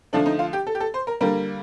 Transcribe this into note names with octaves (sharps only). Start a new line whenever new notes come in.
D3 F3 A3 D4
D#4
F4
G4
A4
G4
A4
C5
A#4
D3 G3 A#3 A#4